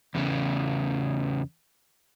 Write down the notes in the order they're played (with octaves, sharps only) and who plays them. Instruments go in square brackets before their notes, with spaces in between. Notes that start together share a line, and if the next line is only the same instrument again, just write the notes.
[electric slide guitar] E2 A2 C#3